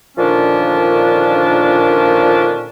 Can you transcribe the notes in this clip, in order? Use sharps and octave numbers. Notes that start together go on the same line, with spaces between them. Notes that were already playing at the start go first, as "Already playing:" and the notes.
A#2 D3 D#3 F3 C#4 D4